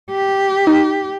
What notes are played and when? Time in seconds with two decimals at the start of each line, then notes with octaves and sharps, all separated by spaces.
0.12 G4
0.67 D#4